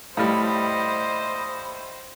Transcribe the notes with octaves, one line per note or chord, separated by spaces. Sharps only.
A2 G3 C5 D#5 F5 B5